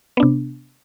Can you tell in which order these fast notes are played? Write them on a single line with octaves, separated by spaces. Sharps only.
B3 D4 C3